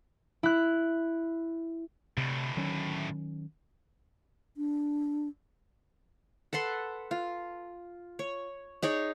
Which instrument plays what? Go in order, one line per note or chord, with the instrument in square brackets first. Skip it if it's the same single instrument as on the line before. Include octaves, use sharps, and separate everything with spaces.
[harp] E4 F#6
[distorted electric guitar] D2 A2 [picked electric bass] C3
[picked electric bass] D#3 F#3 C#4
[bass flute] D4
[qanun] A4 B4 F#5 C6
F4
C#5
D#4 G#4 C#5 D5